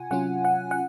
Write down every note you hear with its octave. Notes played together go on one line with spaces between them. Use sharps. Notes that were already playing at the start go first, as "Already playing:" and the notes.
Already playing: C3 F4 F#5 G#5
C3 F#3 C#4 F4 F#5
F#5
F#5